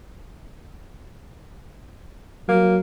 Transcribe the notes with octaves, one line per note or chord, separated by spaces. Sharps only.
F#3 A#3